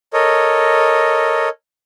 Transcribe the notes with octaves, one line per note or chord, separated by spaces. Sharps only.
A4 A#4 C#5 D#5